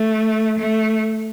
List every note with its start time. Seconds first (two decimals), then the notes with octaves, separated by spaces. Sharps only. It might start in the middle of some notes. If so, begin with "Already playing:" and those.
Already playing: A3
0.58 A3